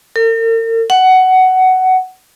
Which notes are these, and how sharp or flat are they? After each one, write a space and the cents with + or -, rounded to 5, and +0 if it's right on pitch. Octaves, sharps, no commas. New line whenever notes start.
A#4 -45
F#5 +15